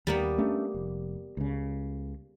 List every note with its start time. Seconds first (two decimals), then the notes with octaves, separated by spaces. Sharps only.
0.07 D#2 G3 A#3 B3
0.38 A3 C#4 D4
0.74 F1
1.37 C#2 C#3